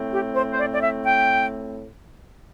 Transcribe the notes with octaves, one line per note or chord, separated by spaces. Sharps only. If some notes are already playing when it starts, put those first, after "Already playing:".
Already playing: A2 A3 C4
G4
C5
C5
D5
D5
E5
G5